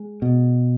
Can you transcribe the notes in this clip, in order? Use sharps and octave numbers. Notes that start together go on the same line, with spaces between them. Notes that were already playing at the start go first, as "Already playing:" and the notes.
Already playing: G#3
B2